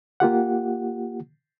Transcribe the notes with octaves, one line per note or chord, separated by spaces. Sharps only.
A#3 F4 G4 F#5